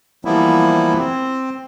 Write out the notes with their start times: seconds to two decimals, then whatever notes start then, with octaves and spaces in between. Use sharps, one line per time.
0.25 E3 F3 G3 A#3 B3 E4
0.97 C4